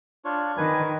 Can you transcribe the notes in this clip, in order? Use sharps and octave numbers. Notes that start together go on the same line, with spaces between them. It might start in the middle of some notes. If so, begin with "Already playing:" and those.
D4 F4 C#5
D#3 B4 G#5